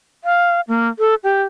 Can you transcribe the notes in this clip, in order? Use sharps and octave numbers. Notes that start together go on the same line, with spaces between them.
F5
A#3
A4
G4